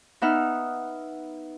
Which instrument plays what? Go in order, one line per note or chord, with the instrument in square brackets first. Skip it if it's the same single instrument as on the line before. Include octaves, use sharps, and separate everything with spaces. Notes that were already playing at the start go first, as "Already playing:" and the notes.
[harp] B3 D#4 E5 F#5 F6